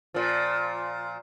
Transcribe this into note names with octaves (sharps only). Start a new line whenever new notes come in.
A#2 F3